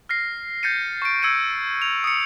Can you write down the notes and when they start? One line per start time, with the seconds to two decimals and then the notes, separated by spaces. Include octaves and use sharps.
0.09 F6 A#6 C7
0.63 G6 A6 A#6 C#7 D#7
1.02 C#6 D7
1.23 E6 G#6 C#7 D#7
1.82 F7
2.04 D#6 C#7